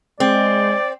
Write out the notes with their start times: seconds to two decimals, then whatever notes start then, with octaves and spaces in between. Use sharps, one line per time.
0.20 G#3 C4 D5